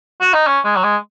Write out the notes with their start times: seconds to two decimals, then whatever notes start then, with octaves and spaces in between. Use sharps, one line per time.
0.21 F#4
0.34 D#4
0.47 C#4
0.65 G#3
0.76 F#3
0.84 G#3